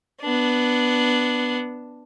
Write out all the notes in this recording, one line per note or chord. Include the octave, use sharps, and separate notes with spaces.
B3 D4